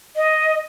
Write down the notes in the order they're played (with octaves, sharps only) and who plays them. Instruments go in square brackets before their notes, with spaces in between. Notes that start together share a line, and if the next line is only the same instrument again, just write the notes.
[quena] D#5